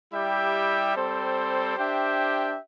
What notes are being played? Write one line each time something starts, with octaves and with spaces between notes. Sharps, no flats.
G3 E4 G4 E5 G5
G3 C4 A4 C5
D4 G4 C5 E5 G5